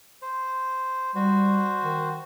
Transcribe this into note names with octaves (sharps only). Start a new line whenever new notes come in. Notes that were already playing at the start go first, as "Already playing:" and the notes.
C5
G3 F#4 C5
D#3